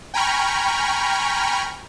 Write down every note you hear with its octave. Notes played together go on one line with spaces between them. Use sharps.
G5 G#5 A#5 B5 C#6 F6